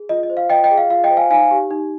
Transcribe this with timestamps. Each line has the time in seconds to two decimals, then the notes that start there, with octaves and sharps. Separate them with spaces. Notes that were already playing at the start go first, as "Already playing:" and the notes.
Already playing: G#4
0.09 F4 D#5
0.23 D#5
0.30 C5
0.37 F5
0.50 F4 D#5 G5
0.64 D#5 G5
0.70 G#4
0.77 F5
0.90 F4 F5
1.04 D#5 G5
1.10 C5
1.17 F5 G#5
1.30 D#4 F5 G#5
1.51 G4
1.71 D#4